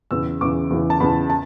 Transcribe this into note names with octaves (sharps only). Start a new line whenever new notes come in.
E2 C#3 E3 E6
E2 C#3 E3 D6
E2 C#3 E3
A5
E2 C#3 E3 B5
A5